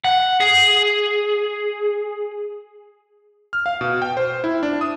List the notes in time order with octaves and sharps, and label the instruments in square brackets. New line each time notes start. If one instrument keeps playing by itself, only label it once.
[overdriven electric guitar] F#5
G#4
[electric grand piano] F6
F5
B2
G5
C5
E4
D4
D#6